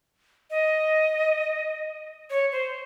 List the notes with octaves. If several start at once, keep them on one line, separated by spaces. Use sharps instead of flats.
D#5
C#5
C5